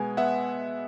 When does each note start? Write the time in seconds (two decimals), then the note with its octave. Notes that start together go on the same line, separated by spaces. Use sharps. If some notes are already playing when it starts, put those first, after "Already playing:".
Already playing: B2 G#3 B3 G#5
0.17 B3 E5 F#5